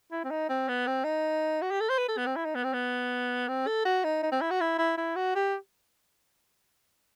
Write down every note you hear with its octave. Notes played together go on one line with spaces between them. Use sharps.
E4
C4
D#4
C4
B3
C4
D#4
F#4
G4
A4
C5
B4
A4
B3
C4
E4
D#4
B3
C4
B3
C4
A4
F#4
D#4
D#4
C4
E4
F#4
E4
E4
E4
F#4
G4